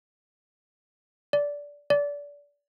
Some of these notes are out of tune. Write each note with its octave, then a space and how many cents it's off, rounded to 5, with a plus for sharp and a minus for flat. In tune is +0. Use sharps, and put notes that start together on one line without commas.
D5 -15
D5 -25